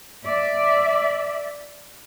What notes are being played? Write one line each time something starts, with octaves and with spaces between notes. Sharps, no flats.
D5 E5